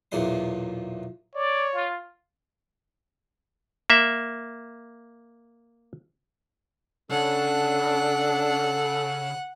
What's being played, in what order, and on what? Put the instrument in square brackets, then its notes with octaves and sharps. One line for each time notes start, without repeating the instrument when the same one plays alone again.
[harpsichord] B1 E2 A#2 C6
[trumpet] C#5 [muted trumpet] D5
[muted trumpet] F4
[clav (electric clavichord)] A#3 E5
[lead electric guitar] C#3 [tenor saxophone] D4 [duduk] A4 [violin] F#5